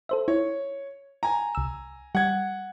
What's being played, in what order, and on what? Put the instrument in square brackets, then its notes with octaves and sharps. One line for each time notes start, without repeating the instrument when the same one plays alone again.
[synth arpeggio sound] A4 C5 E5
[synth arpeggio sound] E4 [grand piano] C#5
[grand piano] G#5 A#5
[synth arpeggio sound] C2 E6
[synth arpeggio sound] G3 [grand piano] F#5 G#6